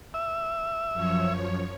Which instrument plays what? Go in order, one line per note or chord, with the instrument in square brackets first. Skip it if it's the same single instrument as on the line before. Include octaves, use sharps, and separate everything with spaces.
[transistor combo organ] E5
[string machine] F#2 F3 C#5